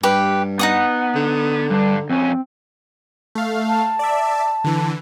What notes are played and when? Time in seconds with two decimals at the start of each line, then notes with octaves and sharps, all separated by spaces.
0.03 G2 G4 B4
0.59 B3 D#4 F#5 D#6
1.15 D3
1.70 G2 G3 D4
2.10 F2 C4 C#4
3.35 A3 F5
3.68 A5
3.99 D5 E5
4.64 D3 E3